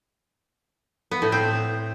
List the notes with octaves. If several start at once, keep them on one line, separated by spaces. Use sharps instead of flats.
B3
A2
C4